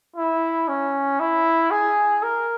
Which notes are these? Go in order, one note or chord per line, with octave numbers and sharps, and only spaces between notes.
E4
C#4
E4
G#4
A#4